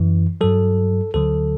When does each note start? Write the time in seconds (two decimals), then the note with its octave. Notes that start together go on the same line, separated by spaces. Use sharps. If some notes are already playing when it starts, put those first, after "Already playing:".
Already playing: F#2 E3
0.41 G2 F#3 A4
1.14 D2 D3 F#3 A4